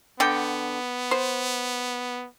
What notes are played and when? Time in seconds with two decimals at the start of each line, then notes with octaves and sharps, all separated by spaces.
0.20 D3 B3 G5
1.11 C5